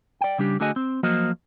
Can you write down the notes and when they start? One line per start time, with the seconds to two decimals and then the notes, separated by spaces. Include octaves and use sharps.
0.21 D5 G5
0.38 C#3 G3 D4 G4
0.60 D3 A3 F#4 G#4 D#5 G#5
0.76 C4
1.03 F3 F#3 A#3 F#4 C5 D#5